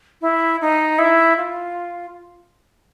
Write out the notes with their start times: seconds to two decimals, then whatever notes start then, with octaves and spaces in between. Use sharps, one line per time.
0.21 E4
0.61 D#4
0.99 E4
1.37 F4